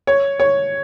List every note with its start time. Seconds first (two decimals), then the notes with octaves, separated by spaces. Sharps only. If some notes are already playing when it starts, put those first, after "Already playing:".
0.07 C#5
0.40 C#5